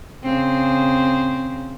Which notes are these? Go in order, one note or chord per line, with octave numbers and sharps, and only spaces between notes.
C#3 C4